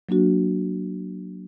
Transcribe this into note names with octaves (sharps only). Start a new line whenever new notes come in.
F#3 A#3 D4 F#4